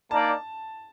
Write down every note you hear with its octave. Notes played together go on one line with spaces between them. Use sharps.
A#3 D#4 A#4 D5 A5